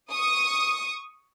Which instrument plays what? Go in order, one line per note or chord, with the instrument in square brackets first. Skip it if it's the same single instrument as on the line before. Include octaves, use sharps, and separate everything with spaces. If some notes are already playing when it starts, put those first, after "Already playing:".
[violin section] C#6 D#6